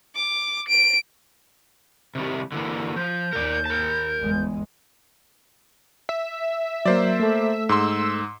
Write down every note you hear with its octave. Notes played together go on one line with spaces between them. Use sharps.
D6
D7
C3 D#3 G3
D3 E3 A#3
F3 G6
D#2 A#4 D5
A#4 A5
G1 E2 G#3
E5
F#3 A#3 C5 D5
A3 A4
G#2 C6 E6